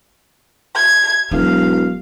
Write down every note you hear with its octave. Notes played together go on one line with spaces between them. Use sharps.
G#6
E1 F#3 F5